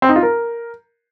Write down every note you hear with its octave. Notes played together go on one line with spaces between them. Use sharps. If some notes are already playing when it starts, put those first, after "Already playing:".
C4
D#4
F4
A#4